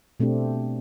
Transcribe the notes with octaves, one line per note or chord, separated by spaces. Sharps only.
B2 A3 C4 D4 G4